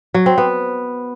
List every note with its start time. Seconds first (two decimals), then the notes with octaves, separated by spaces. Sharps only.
0.14 F#3
0.26 C4
0.38 B3